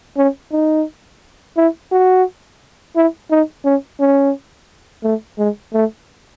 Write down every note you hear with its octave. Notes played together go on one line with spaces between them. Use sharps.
C#4
D#4
E4
F#4
E4
D#4
C#4
C#4
A3
G#3
A3